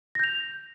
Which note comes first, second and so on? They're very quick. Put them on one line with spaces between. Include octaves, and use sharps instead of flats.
A#6 G6 F7